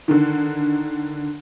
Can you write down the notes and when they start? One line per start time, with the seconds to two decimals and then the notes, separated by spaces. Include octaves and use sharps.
0.08 D3 D#3